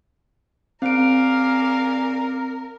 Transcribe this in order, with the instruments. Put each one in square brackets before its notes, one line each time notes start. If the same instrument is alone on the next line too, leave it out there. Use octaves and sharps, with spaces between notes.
[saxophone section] C#3 D5 F5 [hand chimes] C4 D7 [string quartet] A#4